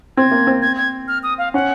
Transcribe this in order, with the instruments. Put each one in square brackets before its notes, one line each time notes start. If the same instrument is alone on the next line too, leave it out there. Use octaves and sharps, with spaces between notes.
[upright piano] C4 [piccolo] G#6
[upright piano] A#3
C4
[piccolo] G#6
G#6
F6
D#6
F5
[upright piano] C#4 [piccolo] F#5